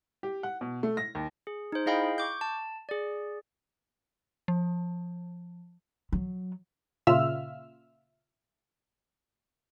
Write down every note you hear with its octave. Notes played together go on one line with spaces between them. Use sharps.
G4
F#5
B2
A3
A#6
D#2
G#4
D#4 C5
E4 G#4 D#5 F5 G5 B5
C#6 D6 G6
A5
G#4 D5
F3
F#3
A#2 C#3 F4 E5 E6 F6